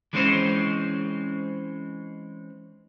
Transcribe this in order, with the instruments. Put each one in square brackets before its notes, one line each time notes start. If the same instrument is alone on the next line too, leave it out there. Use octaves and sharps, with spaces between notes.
[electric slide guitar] E3 G#3 C4 C#4 D#4 C5